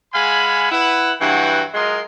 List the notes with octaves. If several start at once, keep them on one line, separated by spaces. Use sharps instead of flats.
G#3 F5 F#5 G#5 B5
E4 B4 F#5
G2 E3 F#3 F#4 F#5 G5
F#3 G#3 F4 A#4 D#5 C6